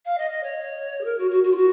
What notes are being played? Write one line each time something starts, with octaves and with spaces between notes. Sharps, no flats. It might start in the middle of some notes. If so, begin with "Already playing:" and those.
F5
D#5
D#5
C#5
G#4
A#4
F#4
F#4
F#4
F4
F#4